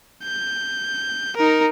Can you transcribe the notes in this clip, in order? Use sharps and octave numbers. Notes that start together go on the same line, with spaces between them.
G6
D#4 A#4